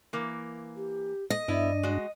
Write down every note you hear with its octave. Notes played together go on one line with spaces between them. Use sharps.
E3 A#3
G4
D#5
G2 B3 D4 E4 D5
G#3 F#4